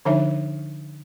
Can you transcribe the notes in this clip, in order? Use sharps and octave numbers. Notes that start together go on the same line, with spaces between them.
D3 F3 D4 D#4 C#5 E5